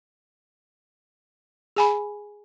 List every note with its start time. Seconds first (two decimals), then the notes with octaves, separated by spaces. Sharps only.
1.76 G#4 G#5 B5